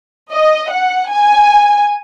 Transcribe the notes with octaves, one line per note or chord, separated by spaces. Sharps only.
D#5
F#5
G#5